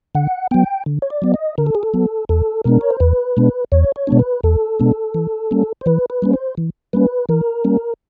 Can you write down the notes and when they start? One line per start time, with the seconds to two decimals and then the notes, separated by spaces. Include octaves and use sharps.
0.15 D3 F#5
0.51 F#3 B3 G5
0.86 D3
1.02 C#5
1.10 D5
1.22 F#3 B3
1.34 D#5
1.58 D3 A#4
1.66 A4
1.75 G#4
1.83 A4
1.94 F#3 B3
2.29 E2 A4
2.64 B2 G#3 B3 D4 A#4
2.81 C#5
2.90 C5
3.00 E2 B4
3.37 B2 G#3 B3 D4
3.72 E2 C#5
3.96 C#5
4.07 B2 G#3 B3 D4
4.19 B4
4.44 E2 A4
4.80 B2 G#3 B3 D4
5.14 E3
5.51 G3 A#3 C#4
5.81 C5
5.86 E3 B4
6.10 B4
6.22 G3 A#3 C#4
6.33 C5
6.57 E3
6.93 G3 A#3 C#4 B4
7.29 E3 A#4
7.64 G3 A#3 C#4